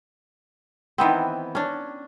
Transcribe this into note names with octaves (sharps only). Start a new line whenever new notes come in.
D#3 E3 B3 C4
C#4 D4